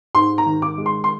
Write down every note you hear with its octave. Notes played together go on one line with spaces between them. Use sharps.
G#2 C6
A#5
D#3
D6
G#3
C6
C6